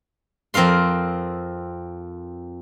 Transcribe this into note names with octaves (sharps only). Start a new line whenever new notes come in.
F2 C4 A#4 F5 C6